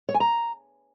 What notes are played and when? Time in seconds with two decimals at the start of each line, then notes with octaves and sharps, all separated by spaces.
0.09 C#5
0.14 G#5
0.20 A#5